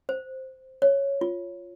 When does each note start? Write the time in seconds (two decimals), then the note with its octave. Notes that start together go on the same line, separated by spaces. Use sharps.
0.09 C5
0.82 C#5
1.21 F4